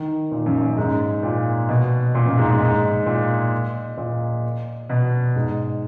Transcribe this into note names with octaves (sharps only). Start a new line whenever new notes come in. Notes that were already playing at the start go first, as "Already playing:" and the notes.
Already playing: D#3
A#2
F#2
F#2
G#2
A#2
B2
A#2
F#2
G#2
G#2
A#2
A#2
B2
G#2